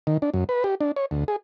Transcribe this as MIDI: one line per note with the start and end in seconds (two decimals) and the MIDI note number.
0.07 0.17 51
0.22 0.30 62
0.34 0.44 42
0.49 0.64 71
0.64 0.75 67
0.81 0.92 62
0.96 1.06 73
1.11 1.24 38
1.28 1.36 68